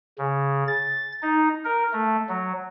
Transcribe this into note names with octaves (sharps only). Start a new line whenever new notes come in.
C#3
A6
D#4
A#4
A3
F#3